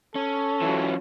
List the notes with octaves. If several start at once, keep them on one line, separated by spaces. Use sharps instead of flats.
C#4 A4
E3 F#3